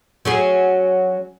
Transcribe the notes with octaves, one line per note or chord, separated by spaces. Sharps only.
F#3 C#4 G#4